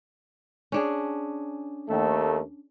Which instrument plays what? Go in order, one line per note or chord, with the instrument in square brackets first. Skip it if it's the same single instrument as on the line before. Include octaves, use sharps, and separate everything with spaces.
[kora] C#4 D4 G#4
[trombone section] D#2 A3